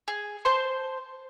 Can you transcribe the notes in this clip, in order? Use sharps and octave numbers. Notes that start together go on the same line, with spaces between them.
G#4
C5 A5 C6